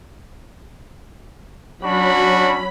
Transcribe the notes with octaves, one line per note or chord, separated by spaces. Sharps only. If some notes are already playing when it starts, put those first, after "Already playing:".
F#3 C#4 D4 F#4 B5